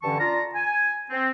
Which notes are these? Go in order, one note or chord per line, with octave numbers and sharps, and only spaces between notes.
G2 D3 E3 C#4 A5 C#6
D4 F4 A5 A#5
G#5
C4